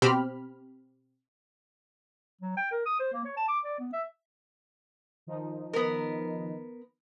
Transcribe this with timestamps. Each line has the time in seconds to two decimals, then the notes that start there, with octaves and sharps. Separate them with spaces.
0.02 B2 C4 G4 B5 F6
2.41 F#3
2.57 G5
2.71 A#4
2.86 D#6
2.99 C5
3.13 A#3
3.24 C#5
3.37 A5
3.48 D6
3.64 D5
3.79 B3
3.93 E5
5.27 D#3 F3 D#4
5.73 B3 A#4